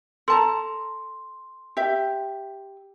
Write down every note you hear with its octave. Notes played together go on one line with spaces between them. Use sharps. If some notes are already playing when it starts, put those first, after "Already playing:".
A4 A5 A#5 C6
G4 E5